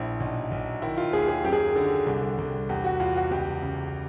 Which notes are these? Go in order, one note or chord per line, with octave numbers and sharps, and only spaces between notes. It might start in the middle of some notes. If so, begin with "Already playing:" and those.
Already playing: A#1 E4
B1
B1
D#3 E4
F4
D#2 G#4
G#4
F#2 G4
G#4
G4
D3
C2
C2
E2 G4
F#4
E2 F4
F#4
C#2 G4
C#3